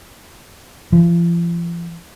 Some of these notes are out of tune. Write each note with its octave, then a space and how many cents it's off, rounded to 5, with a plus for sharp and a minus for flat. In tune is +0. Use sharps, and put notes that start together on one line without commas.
F3 -40